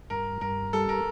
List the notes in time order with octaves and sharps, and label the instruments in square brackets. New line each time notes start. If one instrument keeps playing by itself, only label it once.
[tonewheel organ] G2 [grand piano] A#4
[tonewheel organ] G2 [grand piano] A#4
[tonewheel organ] G3 [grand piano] A4
[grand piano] A#4